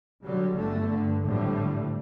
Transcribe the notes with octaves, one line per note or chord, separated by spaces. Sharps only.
D3 F#3 G3
G1 D3 A3
G2 D3
G#1 A2 D3 F3 G3